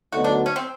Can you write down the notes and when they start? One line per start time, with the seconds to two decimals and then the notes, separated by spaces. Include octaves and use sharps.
0.12 D2 D3 F#3 B3 D#4 F#4
0.24 D4
0.46 C#4
0.56 C4